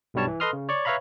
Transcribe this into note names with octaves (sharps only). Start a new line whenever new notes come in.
B1 G2 B2 G3 C#5 A5
E3
A4 B4 D#5 C6 D#6 F6
C#3
C#5 D5 C#6
B4 C#5 E5 F5 A#5 B5